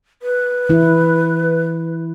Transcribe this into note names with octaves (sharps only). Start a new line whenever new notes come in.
B4
E3 E4